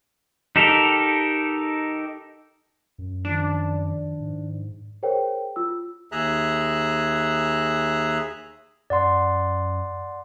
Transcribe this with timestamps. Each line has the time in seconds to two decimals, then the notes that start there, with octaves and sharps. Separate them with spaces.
0.56 D#4 G4 A4 A#4
2.98 F#2
3.25 D#3 F3 D4
4.20 G#2
5.03 G#4 A#4 C5 C#5 G5
5.56 F4 E6
6.12 D#2 G#4 E5 A#5 F#6
8.90 F#2 D5 F#5 C6